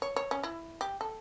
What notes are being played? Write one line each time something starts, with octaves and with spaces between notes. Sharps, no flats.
C#5
C#5
C#4
E4
G4
A4